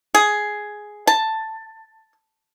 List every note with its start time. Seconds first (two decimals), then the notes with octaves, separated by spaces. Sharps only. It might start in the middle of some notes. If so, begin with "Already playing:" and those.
0.15 G#4
1.07 A5